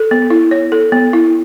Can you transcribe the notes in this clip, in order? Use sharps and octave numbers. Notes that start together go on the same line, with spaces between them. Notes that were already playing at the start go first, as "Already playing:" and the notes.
Already playing: A4
B3
E4
C#5
A4
B3
E4